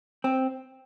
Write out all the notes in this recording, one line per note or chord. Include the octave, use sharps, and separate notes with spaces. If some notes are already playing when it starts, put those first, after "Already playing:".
C4